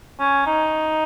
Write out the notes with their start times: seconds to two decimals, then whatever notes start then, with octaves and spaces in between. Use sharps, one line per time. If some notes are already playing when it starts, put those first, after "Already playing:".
0.20 C#4
0.47 D#4